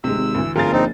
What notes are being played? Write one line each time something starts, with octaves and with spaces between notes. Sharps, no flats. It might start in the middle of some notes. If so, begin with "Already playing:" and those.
D1 C3 G#3 E6
G#1
D2 E3
D1 G1 F4 G#4 A#4 A6
A#1 C4 D#4